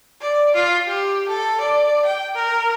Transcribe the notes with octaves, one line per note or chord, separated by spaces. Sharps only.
D5
F4
G4
A4
D5
G5
A#4